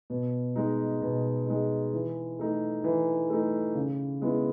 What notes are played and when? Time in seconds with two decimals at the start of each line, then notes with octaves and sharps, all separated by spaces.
0.10 B2
0.56 G#3 D#4
1.02 B2
1.47 G#3 D#4
1.94 E3
2.39 A3 D#4
2.84 E3
3.30 A3 D#4
3.75 C#3
4.22 G#3 B3 E4